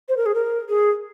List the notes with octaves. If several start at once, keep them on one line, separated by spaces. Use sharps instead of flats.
C5
A#4
G#4
A#4
G#4